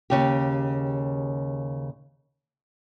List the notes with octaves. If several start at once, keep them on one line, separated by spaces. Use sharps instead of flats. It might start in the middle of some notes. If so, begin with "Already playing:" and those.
D#2 C#3 G4